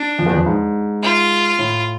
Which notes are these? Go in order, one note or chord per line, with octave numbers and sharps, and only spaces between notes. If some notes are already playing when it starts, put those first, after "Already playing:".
Already playing: D4
F2
E2
F2
G#2
F4
A2